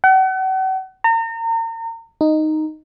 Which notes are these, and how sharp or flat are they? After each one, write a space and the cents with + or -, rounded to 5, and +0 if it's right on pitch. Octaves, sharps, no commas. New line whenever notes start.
F#5 +40
A#5 -35
D#4 -5